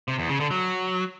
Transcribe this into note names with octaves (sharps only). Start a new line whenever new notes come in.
C3
E2
C#3
D3
F#3